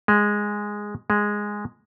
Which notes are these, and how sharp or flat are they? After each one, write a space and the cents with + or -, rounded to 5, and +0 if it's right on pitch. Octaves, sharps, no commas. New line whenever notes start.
G#3 -5
G#3 -5